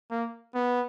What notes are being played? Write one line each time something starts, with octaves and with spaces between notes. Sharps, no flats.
A#3
B3